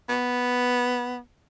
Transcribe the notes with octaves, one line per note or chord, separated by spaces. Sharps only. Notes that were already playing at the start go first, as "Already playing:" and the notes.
B3